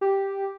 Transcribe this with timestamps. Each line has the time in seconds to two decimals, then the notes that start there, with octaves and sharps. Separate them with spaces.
0.01 G4